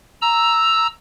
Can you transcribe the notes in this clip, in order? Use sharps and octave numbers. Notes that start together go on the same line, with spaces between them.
A#5 E6